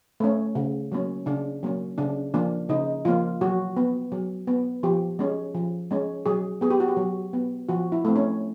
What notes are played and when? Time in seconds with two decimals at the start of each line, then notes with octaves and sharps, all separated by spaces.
0.20 A3 C#4
0.55 C#3
0.92 F#3 A#3 C#4
1.26 C#3 D4
1.63 F#3 A#3 C#4
1.98 C#3 D4
2.34 F3 A#3 D4
2.69 C#3 D#4
3.05 F3 A#3 F4
3.41 F#3 F#4
3.77 B3
4.12 F#3
4.47 B3
4.83 F3 G4
5.19 G#3 C#4
5.55 F3
5.91 G#3 C#4
6.26 F#3 G#4
6.61 B3 G#4
6.70 G4
6.80 F#4
6.88 G4
6.97 F#3
7.33 B3
7.69 F3 F#4
7.92 E4
8.05 A3 C4
8.16 C#4